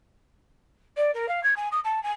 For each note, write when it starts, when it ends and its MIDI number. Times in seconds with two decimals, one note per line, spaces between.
0.97 1.11 74
1.14 1.28 70
1.28 1.42 77
1.43 1.54 92
1.56 1.68 80
1.72 1.80 87
1.84 2.02 81
2.03 2.11 80